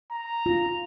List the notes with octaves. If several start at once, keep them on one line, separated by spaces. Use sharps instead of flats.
A#5
F4